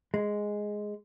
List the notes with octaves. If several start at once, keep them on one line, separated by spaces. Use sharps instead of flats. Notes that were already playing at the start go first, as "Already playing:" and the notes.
G#3